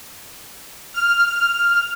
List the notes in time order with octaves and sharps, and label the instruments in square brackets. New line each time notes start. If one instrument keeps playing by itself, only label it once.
[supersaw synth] F6